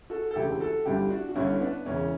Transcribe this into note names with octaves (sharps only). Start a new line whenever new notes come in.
F#4 A4
A4
E1 D2 C#3 E4 G4
F#4 A4
G1 G2 D3 E4 G4
D4 F#4
F#4
G1 G2 D3 C#4 E4
B3 D4
E1 E2 C#3 E3 C#4